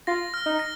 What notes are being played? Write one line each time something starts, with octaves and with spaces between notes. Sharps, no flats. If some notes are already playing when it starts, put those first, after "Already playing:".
F4 A#6
F6
D#4
A#6